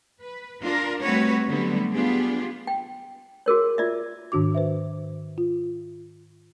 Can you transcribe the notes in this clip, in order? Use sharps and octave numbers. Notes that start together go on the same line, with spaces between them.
B4
D4 F4 A#4
G3 A3 C4 F#4 B4 C#5
D3 F#3 G3 A3 B3
B3 D4 F4 G4 G#4
G5
F#4 G#4 A#4 C#5
F4 D5 E5
G#2 D#3 D4 F#4 D6
B4 C5 E5
F4